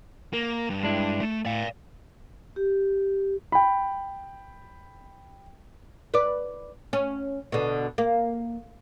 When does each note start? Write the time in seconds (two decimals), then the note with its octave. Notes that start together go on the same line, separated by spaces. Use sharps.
0.33 A#3
0.70 G2
0.83 G#3 D4 E4
1.21 A3
1.45 A2 D5 F5
2.56 G4
3.52 G5 B5
6.14 B4 D5
6.93 C#4
7.52 B2 D3
7.98 A#3